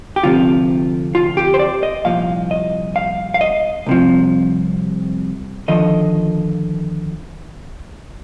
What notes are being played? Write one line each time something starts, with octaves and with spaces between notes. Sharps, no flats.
G4
D2 C3 F3 F4
F4
G4
C5
D5
D#5
C2 A#2 F3 F5
D#5
F5
F5
D#5
C2 C3 F3
D#2 D3 F3 D#5